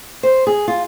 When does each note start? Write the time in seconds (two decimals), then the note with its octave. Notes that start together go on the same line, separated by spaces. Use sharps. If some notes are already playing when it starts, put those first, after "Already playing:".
0.23 C5
0.47 G#4
0.68 F4